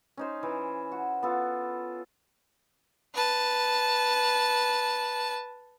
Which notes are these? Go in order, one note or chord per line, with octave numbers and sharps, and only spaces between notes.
C#4 D#4 C5
E3
F#4
B3 F4 A4
B4 A5